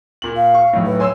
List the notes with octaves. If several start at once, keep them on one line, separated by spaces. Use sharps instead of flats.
A#2 F#7
F5
C#6
B1 A2
B4
C#5 G#5 C6 E6